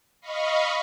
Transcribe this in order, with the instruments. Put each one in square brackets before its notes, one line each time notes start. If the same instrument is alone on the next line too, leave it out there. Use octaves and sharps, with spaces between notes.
[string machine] D#5 F5 B5 C#6